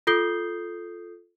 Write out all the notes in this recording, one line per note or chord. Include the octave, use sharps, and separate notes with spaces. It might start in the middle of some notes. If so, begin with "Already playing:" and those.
F4 A4 D#6 G6 C7 G7